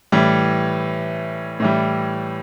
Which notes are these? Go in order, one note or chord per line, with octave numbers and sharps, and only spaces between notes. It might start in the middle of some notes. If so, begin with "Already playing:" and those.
A2 E3 G3
A2 E3 G3